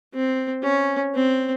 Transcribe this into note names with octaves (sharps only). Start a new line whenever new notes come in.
C4
C#4
C4